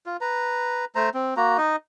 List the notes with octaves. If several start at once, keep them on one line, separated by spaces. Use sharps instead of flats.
F4
B4 A#5
A3 C5 A#5
C4
A#3 F#4 A#5
D#4 D#5